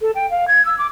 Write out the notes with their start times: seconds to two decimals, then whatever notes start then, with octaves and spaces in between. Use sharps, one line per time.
0.01 A4
0.15 G5
0.30 F5
0.48 G#6
0.65 E6
0.78 D6